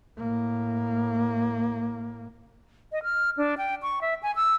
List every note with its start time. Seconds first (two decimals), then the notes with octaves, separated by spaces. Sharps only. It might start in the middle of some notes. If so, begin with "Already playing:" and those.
0.18 A2 A#3
2.92 D#5
3.03 F6
3.37 D4
3.58 G5
3.82 C#6
4.01 E5
4.23 G#5
4.36 E6